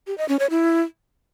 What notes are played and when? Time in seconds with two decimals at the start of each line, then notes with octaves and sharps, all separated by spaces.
0.07 G4
0.18 D#5
0.29 C#4
0.39 C#5
0.50 E4